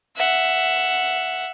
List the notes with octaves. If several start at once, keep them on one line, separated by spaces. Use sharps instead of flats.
E5 F#5